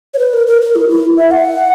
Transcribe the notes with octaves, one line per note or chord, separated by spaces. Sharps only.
C#5
B4
A#4
A#4
A#4
E4
E4
E5
F#5